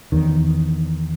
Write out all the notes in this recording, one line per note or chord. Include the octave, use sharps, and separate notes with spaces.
E2 D#3